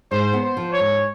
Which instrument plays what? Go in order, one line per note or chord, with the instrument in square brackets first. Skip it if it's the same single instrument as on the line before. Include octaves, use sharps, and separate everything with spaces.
[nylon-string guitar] G#2 [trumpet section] C5
[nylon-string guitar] B3
[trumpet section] C5
[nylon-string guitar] F3
[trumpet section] C#5
[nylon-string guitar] G#2